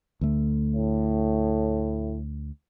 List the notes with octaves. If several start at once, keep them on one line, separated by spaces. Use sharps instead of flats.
D2 A3
A2